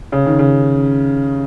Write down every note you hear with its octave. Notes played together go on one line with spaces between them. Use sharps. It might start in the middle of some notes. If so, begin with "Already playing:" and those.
C#3
D#3
C#3